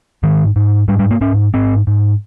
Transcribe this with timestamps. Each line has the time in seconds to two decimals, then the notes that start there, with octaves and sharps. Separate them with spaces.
0.23 G#2 D#3
0.56 G#2
0.88 G#2 G3
0.99 G3
1.11 A#3
1.21 G#2 C#4
1.54 G#2 C4
1.87 G#2